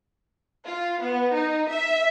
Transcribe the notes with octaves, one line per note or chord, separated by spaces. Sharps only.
F4
B3
D#4
E5